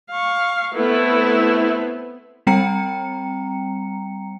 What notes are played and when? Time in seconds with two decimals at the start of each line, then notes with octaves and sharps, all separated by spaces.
0.10 F5 C#6
0.75 A3 B3 C4 E4
2.47 G3 C4 G5 A#5 C#7